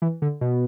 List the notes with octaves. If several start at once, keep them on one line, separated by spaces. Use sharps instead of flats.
E3
D3
B2